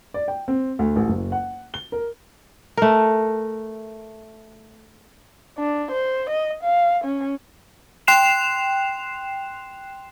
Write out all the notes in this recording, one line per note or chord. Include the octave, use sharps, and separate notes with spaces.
D5
G5
C4
D2
A1
F#1
F#5
G7
A#4
A3 A#4
D4
C5
D#5
F5
C#4
G5 C6 F#6 C7 E7 F7